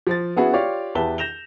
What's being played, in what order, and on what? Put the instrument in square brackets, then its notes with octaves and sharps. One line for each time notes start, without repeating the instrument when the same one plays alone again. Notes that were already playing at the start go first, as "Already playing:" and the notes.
[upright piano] F3 C5 A6
B3 C#4 E4 F#4 G#4 B4
F4 G4 C#5 D5 F5
E2 G4 B4 E5 A5 G7
G6 A#6 E7 F7 G7